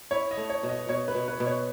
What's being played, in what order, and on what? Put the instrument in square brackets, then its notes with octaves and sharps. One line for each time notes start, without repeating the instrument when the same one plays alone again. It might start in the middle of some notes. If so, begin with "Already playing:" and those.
[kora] E4 [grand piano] C#5
[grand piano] D#5
[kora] A3
[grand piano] C#5
[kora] B2
[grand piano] D#5
[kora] B2 [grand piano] C#5
[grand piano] B4
[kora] B2
[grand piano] B4
[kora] B2
[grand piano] C#5